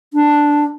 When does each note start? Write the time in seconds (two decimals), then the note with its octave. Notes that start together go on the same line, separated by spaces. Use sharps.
0.14 D4